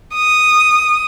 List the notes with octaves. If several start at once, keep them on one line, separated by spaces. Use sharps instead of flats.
D#6